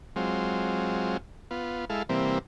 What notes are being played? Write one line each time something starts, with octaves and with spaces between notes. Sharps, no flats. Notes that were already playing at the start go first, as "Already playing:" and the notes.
F#3 G#3 C4 F4
B3 F4
G#3 E4 A4 F5
C3 E3 G3 A#3 C4